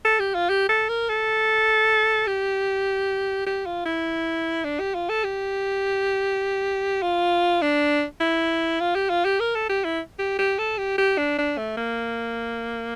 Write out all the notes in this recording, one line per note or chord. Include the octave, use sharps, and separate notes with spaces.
A4
G4
F4
G4
A4
A#4
A4
G4
G4
F4
E4
D4
G4
F4
A4
G4
F4
D4
E4
F4
G4
F4
G4
A#4
A4
G4
E4
G4
G4
A4
G4
G4
D4
D4
A3
A#3